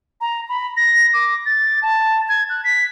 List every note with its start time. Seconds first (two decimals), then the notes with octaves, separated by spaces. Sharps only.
0.21 A#5
0.49 B5
0.77 A#6
1.14 D6
1.46 A6
1.82 A5
2.29 G#6
2.50 F#6
2.64 B6